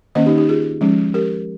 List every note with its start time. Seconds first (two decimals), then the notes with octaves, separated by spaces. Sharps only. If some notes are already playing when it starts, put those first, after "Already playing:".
0.15 D#3 A#3 C#4 C5 D#5
0.26 D#4 G4
0.37 D#4 G4
0.49 F4 G#4
0.81 F3 G#3 C#4
1.14 G4 A#4